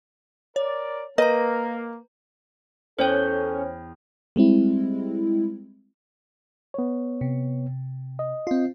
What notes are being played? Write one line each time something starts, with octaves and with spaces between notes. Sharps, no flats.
A#4 C#5 D5
A#3 A#4 B4 D#5 A#5
E2 C#4 A4 C5 C#5 G5 G6
G3 G#3 C4 E4
B3 C#5
C3
D#5
C4 F4